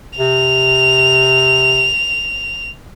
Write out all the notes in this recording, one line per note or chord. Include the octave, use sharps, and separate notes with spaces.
C3 F7